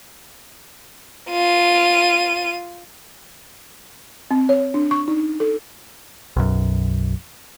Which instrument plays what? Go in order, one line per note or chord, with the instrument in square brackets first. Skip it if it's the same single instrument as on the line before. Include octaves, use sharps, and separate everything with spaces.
[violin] F4 D#7
[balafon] C4
C#5
D4
C#6
D#4
A4
[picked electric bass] B1 F#2